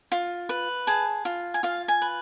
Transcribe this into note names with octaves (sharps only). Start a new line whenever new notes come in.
F4
B4
G#4 A5
F4
G#5
F4 F5
G#5
B4